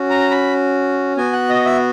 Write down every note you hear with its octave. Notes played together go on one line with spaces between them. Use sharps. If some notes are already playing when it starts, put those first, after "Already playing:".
Already playing: C#4 F#4
A#5
B5
B3 F#4 G#5
F#5
D#5
E5